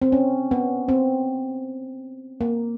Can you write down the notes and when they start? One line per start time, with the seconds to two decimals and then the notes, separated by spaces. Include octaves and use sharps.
0.02 C4
0.12 C#4
0.51 B3
0.89 C4
2.41 A#3